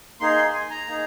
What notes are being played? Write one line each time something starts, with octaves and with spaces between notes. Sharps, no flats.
A#3 D#4 G#4 C6
C6
G#5
A#5
A#3 D#4 G#4